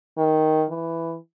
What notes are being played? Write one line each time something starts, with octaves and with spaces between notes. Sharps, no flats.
D#3
E3